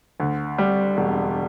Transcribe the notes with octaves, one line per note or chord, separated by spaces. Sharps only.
D2
G3
E1